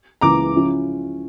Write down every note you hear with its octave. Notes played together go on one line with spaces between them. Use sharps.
C#2 C#3 E3 A#3 A#5 D6
C#3 F3 C#4 E4